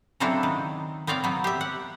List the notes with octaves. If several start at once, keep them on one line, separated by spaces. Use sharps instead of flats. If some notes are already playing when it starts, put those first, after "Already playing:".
C#3 F#3 C4 D4 E4 A4
D#3
B3 C4 C#5 D5 F5
F#3 B3
G4 E5
F#5